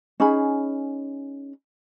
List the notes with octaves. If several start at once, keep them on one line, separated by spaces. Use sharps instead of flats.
C#4 D#4 G#4 B5